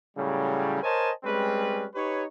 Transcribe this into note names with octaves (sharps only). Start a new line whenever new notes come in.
A2 C#3 F#3 G3
A#4 C5 C#5 D#5 G#5 A5
G3 G#3 C4 C#4 B4
D#4 G4 B4 C#5